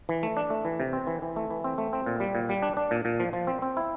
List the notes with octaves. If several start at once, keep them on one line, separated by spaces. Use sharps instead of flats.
E3
A3
D4
A3
E3
C3
C4
E3
E3
A3
E3
C4
A3
C4
A#2
G3
A#2
G3
D4
D4
A#2
A#2
F3
F3
C4
C4
E4